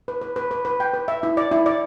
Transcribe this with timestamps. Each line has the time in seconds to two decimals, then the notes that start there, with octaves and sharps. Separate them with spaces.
0.08 B4
0.21 B4
0.36 B4
0.51 B4
0.65 B4
0.80 G5
0.94 B4
1.08 E5
1.23 E4
1.37 D5
1.52 E4
1.66 D5